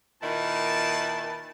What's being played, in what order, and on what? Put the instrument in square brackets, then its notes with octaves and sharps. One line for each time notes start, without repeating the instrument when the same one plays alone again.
[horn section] A#2 D#3 E4 B4 A5